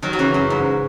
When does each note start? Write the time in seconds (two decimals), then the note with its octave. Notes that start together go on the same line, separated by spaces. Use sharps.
0.02 D#3 F#3
0.13 F#3
0.19 C#3 E3
0.34 F#2
0.50 G#2